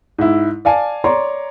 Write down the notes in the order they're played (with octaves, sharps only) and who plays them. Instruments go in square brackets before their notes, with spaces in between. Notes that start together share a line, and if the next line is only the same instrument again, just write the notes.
[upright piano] G#2 E4
D5 F5 G#5 A5
C#5 D5 A#5 C6